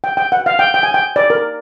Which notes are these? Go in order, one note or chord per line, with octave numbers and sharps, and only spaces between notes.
G5
G5
F#5
F5
G5
G5
G#5
G5
D5
A#4